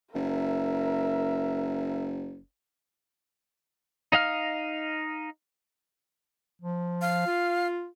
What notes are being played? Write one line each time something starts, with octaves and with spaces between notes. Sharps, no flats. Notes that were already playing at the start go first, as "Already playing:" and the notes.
F#1 A#4 E5
D#4 D#5 F5 F6
F3
F5
F4